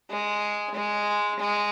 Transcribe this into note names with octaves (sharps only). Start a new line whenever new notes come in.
G#3
G#3
G#3